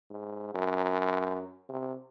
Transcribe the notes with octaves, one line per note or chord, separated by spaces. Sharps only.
G#2
F#2
C3